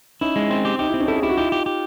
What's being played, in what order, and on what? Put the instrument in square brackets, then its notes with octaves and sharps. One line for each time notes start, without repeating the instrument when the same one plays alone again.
[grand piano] C#4 D#4 [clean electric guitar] E4
[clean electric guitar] G#3
C4
G4
[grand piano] D#4 [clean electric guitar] G4
[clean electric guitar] C4 [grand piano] E4
[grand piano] C#4 D#4
[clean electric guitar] E4 [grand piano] A4
[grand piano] G#4
[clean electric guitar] E4 [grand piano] G4
[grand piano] F#4
[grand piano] D#4 F4 [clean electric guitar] G4
[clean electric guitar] G4
G4